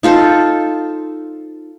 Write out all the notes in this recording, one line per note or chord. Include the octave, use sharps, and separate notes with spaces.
D#4 F4 A4 C5